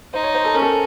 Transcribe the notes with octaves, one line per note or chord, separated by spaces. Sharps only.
D#4 C5
C#5
C5
A4
C#4 A#4
A4